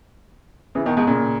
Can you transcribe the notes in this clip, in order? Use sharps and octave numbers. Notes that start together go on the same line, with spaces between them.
C#3 E3
B2 D#3
G#2 B2
A#2 C#3